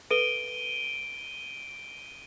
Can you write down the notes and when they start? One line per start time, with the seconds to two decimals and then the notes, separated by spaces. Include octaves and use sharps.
0.11 A4 B4 E5 D7 D#7 G7